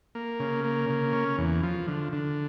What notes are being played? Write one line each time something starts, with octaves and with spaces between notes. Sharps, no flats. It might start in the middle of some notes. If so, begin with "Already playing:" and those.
A#3
C#3
A#3
C#3
C#4
E2
F3
D3
D3